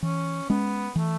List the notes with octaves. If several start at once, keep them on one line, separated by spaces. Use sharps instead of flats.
E3 C#4
G#3 B3 C#4
E3 A3